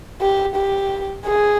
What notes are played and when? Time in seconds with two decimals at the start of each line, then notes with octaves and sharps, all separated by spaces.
0.21 G4
0.56 G4
1.26 G#4